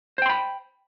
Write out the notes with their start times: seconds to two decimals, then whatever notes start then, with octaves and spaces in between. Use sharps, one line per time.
0.18 C5
0.22 G5
0.26 C6
0.30 B5